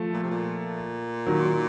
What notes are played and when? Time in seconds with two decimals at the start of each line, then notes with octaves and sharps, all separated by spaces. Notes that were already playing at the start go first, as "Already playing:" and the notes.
Already playing: F3 A3
0.13 A#2
0.23 C3
0.30 A#2
1.27 D#3 F#3